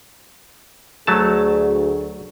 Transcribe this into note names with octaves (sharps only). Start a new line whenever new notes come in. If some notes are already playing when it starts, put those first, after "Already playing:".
D2 F#3 A3 G#4 A5